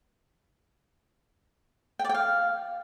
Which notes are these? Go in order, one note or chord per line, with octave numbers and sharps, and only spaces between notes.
G5
D5
G5
F5